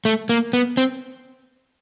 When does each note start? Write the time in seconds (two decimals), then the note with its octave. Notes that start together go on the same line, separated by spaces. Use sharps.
0.05 A3
0.29 A#3
0.53 B3
0.77 C4